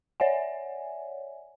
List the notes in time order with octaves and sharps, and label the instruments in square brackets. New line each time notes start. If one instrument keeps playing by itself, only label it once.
[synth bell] C#5 D5 E5 F#5 G#5